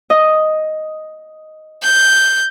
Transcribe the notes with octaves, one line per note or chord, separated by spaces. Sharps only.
D#5
G6